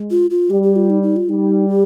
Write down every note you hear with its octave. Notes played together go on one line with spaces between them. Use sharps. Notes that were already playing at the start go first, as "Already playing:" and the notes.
Already playing: G#3
F4
F4
G3 G4
G4
F4
D#4
D#4
F4
G3 D#4
G4